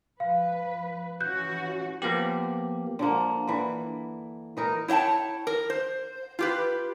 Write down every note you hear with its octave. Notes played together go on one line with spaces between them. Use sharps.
F3 B4 F5
E3 C#4 F#4 F#6 G6
F3 A#3 B3 G4
D3 F3 A#3
D3 E3
E3 D#4 A#4
E4 C#5 E5 G5 A5
A#4
C5
F4 G4 B4